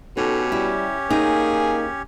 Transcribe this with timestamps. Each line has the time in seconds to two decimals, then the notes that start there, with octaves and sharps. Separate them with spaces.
0.17 B2 C#4 D#4 G4 A4 C#5
0.52 G3 E4
1.10 A#3 D#4 G#4